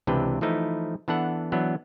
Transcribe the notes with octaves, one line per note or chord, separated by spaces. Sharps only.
C#2 C3 E3 D4 B4 G5
E3 F3 A3 D#4 E4
E3 B3 D4 A4 F#5
E3 F#3 B3 D4